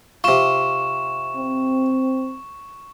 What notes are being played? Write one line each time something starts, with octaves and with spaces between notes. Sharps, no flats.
C3 F4 C#6 E7
C4